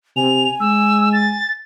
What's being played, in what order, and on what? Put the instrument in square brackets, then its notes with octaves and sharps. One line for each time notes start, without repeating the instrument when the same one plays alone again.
[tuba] C3 [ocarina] G#5 [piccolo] F7
[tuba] G#3 [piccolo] E6
[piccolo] A6